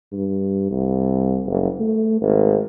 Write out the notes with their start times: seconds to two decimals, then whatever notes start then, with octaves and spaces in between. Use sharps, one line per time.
0.13 G2
0.71 C2
1.46 F#1
1.80 A3
2.22 G#1